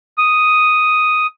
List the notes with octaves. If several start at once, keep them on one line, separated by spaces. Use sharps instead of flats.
D#6